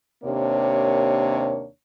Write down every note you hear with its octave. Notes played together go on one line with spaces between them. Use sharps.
D#2 C3 A#3 D4 C#5